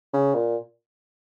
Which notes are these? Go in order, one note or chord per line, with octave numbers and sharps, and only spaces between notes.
C#3
A#2